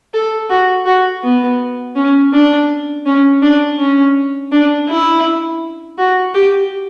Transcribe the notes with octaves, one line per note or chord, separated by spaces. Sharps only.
A4
F#4
F#4
B3
C#4
D4
C#4
D4
C#4
D4
E4
F#4
G4